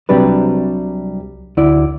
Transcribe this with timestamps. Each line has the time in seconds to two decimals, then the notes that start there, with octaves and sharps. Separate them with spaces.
0.09 C2 C3 F#3 G3 D4 B4
1.57 D2 E4 D5